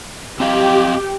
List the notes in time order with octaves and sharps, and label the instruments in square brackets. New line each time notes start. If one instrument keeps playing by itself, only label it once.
[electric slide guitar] C4 D#5 F5 [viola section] G4